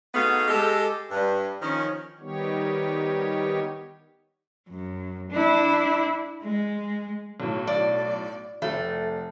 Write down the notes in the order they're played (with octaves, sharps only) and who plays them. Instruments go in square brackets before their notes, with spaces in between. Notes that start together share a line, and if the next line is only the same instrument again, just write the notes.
[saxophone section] A3 B3 D#4 F#4 G#4 F5
G#3 G4 A4
G2
D#3 F3 C#4
[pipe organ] D#3 G3 B3 D#4 G4 C#5
[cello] F#2
D4 E4
G#3
[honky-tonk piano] B1 A2
[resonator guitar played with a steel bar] D5
[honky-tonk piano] F1 [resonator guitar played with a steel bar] A3